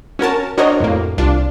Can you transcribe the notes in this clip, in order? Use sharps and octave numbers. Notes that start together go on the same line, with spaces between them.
C#4 F#4 A#4 A5
D4 F#4 A#4 C5 C#5 D#5
F2 A2 A#3
C2 D4 F4